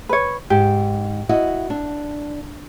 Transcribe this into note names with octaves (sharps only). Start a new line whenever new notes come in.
B4 C#5
G#2 G4
E4 F#4 D#5
D4